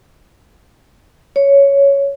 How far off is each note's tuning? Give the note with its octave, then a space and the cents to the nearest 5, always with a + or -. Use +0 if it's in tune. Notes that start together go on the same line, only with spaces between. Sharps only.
C#5 +5